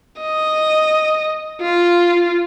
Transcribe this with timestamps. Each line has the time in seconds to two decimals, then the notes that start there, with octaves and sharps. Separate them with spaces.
0.21 D#5
1.62 F4